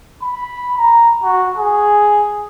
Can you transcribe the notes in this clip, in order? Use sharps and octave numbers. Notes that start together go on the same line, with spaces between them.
B5
A#5
F#4
G#4